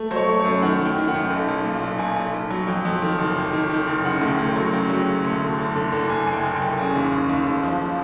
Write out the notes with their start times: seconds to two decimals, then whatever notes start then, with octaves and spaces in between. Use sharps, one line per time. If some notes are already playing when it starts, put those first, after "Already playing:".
Already playing: A3
0.11 F#3 C5
0.16 C#5
0.28 A3
0.39 C#5
0.45 F#2
0.62 D#3 F#5
0.80 F#2
0.86 G5
0.97 D#3
1.08 F#5
1.14 F#2
1.30 B1
1.48 B1
1.64 A#2
1.82 B1
1.98 B1 G#5
2.16 B1
2.33 B1
2.51 F#3
2.67 F2 G5
2.85 F2
3.02 D#3
3.19 F#1
3.35 F#1
3.53 D#3
3.69 D#3
3.87 F#1
4.04 C#3 F#5
4.21 D2
4.27 G5
4.38 D2
4.50 G5
4.56 F#3
4.73 C#3 G5
4.90 F#3
5.07 C#3
5.25 D2
5.41 D3
5.58 F#1
5.76 D3
5.92 F#1
6.09 F#1 G#5
6.27 F#1 G#5
6.33 G5
6.43 F#1
6.55 G5
6.62 F#1
6.78 C#3 G#5
6.96 D#2
7.12 C#3
7.29 D#2
7.46 D#2
7.64 F3